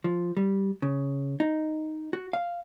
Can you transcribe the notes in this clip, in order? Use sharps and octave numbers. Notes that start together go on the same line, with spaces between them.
F3
G3
C#3
D#4
F#4
F5